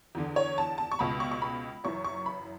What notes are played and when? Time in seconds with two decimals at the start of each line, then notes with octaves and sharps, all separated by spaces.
0.15 E2 D3
0.36 C#5
0.58 A5
0.78 A5
0.92 C#6
0.99 C#2 B2 B5
1.20 C#6
1.31 C#6
1.42 B5
1.84 F#1 F#2 E3 C#6
2.04 C#6
2.26 B5